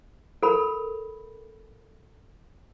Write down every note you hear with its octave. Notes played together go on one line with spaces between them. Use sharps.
A4 A#4 B5